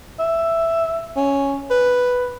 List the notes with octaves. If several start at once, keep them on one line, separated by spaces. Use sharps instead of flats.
E5
C#4
B4